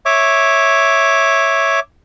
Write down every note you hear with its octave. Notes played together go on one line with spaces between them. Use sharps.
C#5 E5 D6